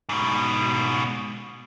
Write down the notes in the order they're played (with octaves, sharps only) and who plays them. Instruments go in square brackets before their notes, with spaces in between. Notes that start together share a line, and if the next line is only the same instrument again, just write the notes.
[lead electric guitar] G#2 B2